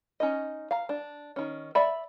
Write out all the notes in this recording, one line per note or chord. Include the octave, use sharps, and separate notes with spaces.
C#4 D#4 D#5
F5 A#5
D4
D#3 C#4
D5 E5 B5